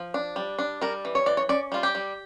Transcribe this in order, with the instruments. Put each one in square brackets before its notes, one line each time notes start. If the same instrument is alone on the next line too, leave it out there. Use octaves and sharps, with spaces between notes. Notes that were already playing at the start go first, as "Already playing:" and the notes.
Already playing: [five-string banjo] F3
D4
G3
D4
G3 A#4
E3
C#5
E3 D5
C#5
C#4 D5
G3 F4
G4
G3